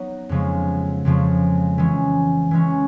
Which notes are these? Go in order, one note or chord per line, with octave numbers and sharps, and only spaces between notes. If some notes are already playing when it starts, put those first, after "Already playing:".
Already playing: F#3 B3 D#4
F2 C#3 F3 G#3
F2 C#3 F3 G#3
E3 G#3 C#4
E3 G#3 C#4